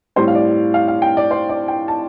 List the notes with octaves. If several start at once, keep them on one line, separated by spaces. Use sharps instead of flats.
A2 G3 C4 C5
F5
D5
F5
F5
G5
D5
C5
D5
G5
A5